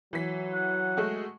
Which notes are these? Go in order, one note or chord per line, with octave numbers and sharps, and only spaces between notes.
E3 F#3 B6
F#5
G#3 A3 F#4